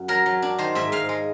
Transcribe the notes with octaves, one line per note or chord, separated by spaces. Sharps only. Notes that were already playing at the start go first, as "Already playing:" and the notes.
Already playing: F#2
F#3 A#4
F#3
D4
D#3 C5
G#2 E5
G#2 F5
G#3